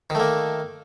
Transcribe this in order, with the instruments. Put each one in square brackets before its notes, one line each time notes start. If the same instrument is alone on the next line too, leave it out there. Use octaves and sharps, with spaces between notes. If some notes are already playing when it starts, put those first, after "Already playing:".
[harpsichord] D#3
A3
A#3